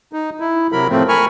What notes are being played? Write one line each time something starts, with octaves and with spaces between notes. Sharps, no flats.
D#4
E4
C3 F#3 A#4 B5
A2 F3 A3 C4
A#4 G#5 B5 C#6 F6